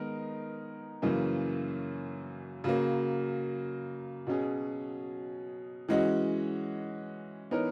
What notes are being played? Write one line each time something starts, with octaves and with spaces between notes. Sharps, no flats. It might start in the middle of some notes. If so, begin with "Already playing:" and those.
Already playing: D#3 G#3 B3 D#4 A#4
F#2 C#3 E3 A#3 C#4
C#3 F#3 A#3
B2 F#3 C#4 G#4
E3 G#3 C#4 F#4
E3 B3 D#4 A#4 C#5